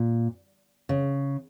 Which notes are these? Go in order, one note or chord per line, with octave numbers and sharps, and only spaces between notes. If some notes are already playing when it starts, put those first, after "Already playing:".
Already playing: A#2
C#3